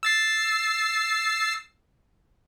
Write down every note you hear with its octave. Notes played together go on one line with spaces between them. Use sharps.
E6 A6 C7